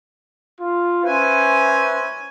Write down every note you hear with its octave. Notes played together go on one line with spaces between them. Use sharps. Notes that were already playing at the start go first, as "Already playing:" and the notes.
F4
C#4 B4 C5 E5 G#5